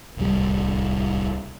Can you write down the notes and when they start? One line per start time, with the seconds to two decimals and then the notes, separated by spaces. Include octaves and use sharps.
0.17 D1 C2 G3